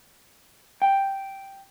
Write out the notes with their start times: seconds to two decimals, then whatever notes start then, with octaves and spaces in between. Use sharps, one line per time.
0.82 G5